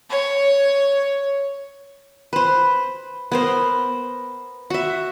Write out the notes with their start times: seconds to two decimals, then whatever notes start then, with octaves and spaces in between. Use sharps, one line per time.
0.10 C#5
2.33 B4 C5
3.32 B3 A#4 C5
4.70 F#4 E5